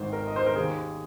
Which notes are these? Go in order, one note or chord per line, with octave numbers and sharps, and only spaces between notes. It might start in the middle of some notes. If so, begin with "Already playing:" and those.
Already playing: G#1 G#2 D#3 C5
A#4
D#5
C5
A#4
D#2 D#3 G#4